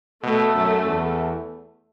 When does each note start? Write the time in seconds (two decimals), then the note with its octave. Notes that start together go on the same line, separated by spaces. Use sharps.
0.23 B2 A3
0.55 F#2
0.86 E2